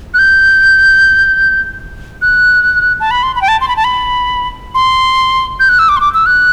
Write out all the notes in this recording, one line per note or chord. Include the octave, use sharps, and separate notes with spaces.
F#6
G6
F#6
A5
B5
C6
B5
G5
A5
C6
B5
A5
B5
C6
G6
F#6
E6
D6
C6
D6
E6
F#6